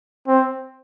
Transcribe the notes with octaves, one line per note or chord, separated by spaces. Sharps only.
C4